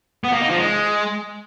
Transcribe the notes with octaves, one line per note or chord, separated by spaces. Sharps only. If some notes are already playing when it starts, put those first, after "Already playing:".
B3
A#3
D#4
F3
G#3